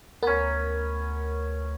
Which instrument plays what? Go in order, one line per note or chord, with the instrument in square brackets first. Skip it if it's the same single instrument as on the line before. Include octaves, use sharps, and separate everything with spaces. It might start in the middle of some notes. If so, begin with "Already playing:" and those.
[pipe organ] D2 [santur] B3 C#4 [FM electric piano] A#4